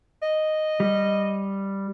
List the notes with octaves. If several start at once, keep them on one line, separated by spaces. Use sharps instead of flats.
D#5
G3